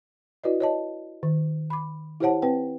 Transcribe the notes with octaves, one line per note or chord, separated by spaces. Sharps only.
E4 F#4 B4 D5 D#5
C#5 D#5 A5
D#3
B5 D6
E4 G4 C5 C#5 F#5 A5
C4 B4 G5